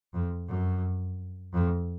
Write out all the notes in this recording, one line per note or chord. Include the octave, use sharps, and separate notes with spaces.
F2
F#2
F2